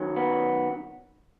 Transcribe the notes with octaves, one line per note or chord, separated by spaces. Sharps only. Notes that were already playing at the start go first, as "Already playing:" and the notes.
Already playing: F#2 D#3 F#3
B3